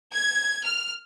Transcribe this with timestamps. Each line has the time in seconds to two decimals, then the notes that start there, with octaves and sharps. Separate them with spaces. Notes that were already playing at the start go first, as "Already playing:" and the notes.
0.13 G#6
0.64 F6